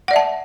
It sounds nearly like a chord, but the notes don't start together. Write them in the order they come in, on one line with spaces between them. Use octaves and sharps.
F#5 D5 E5 A5